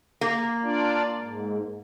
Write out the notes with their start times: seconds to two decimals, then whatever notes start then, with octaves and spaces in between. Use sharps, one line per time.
0.21 A#3
0.63 D4 F4 D5
1.19 G#2